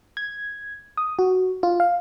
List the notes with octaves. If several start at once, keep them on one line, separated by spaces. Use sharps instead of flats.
G#6
D#6
F#4
F4
F5